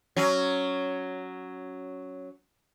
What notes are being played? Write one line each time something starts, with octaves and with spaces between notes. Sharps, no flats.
F#3 C#4